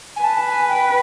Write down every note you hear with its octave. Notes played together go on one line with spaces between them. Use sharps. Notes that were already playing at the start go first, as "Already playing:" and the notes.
G#5
B4 A5
G#5
G5